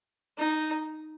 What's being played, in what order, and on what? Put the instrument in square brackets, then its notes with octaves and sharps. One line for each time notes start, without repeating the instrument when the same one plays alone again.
[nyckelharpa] D#4